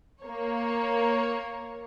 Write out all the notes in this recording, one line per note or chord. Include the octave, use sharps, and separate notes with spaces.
A#3 C#5